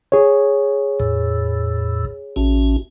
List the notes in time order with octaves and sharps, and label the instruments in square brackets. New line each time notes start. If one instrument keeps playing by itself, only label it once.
[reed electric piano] G#4 C#5
[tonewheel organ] E2 A2
A1 C#4 F#4